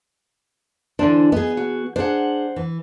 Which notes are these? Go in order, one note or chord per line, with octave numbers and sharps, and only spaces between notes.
D3 E3 D4 C5
B3 G#4 D#5
F#4
D4 G#4 C5 F#5
E3